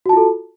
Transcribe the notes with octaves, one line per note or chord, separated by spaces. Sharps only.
F4 F#4 A4 A5